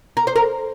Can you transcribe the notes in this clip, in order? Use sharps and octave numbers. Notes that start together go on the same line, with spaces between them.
A#4
C5
A#4